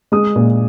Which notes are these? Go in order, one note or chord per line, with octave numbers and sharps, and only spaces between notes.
G#3 D#6
A#2